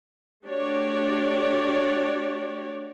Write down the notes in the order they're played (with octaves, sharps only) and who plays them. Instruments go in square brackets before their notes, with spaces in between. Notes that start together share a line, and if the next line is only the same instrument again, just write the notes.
[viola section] A3 D4 F#4 G4 C#5 D5